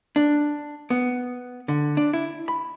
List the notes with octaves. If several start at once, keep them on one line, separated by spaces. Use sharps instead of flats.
D4
B3
D3
D4
E4
B5